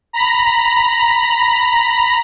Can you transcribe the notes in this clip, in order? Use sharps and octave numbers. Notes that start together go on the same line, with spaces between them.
A#5 B5